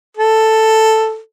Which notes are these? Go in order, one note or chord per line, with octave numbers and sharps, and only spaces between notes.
A4